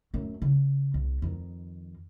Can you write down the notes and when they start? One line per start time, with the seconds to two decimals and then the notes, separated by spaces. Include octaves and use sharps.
0.14 F#2 A3
0.42 C#3
0.94 C2
1.22 F2 D#3